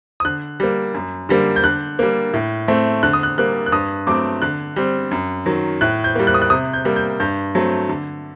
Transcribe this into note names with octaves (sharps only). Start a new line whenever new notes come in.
D#6
D3 F#6
G3 A#3
F#2
D3 G3 A#3
G6
D3 F#6
G3 A#3
A2
A3 C4
D3 F#6
D#6
F#6
G3 A#3 F#6
F#6
G2 D#6
F#3 A3 C4 D6
D3 F#6
G3 C4
F#2
D#3 F#3
A2 F#6
G6
G3 A#3
F#6
D#6
F#6
C3 D#6
G6
G3 A#3
G6
G2 G6
F#3 A3 C4
D3